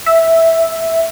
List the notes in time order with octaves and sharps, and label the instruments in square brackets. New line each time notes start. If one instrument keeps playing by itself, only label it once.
[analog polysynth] E5